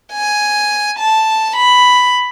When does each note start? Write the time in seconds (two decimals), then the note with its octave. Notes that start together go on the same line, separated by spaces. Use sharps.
0.13 G#5
0.98 A5
1.56 B5